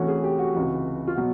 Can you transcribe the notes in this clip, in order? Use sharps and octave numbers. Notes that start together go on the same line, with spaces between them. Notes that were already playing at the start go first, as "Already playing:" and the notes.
Already playing: C3 E3 A3 C#4 F#4
G#4
G4
F#4
C#2 C3 E3 F#4
F4
B2 F#3 F#4